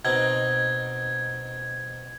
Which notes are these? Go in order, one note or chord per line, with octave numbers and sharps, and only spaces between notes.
B2 C4 D#4 G#6